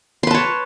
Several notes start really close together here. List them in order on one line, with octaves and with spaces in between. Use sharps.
C6 B4 A5 C#5